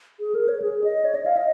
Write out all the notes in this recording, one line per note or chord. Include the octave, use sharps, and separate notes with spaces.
G#4
A#4
C#5
G#4
D#5
C#5
D#5
F5
D#5